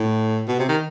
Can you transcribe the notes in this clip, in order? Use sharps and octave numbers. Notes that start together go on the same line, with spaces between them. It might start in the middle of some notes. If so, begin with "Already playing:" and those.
Already playing: A2
B2
C3
D#3